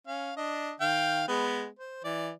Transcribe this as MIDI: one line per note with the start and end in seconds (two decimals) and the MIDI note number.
0.07 0.32 61
0.07 0.32 77
0.37 0.72 62
0.37 0.72 75
0.81 1.26 51
0.81 1.26 77
0.81 1.26 79
1.28 1.67 56
1.28 1.67 59
1.79 2.00 72
2.04 2.31 52
2.04 2.31 74